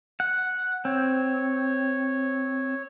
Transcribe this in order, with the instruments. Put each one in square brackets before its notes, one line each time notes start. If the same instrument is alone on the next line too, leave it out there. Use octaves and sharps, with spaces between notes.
[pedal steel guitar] F#5
[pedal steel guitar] C4 [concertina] C#5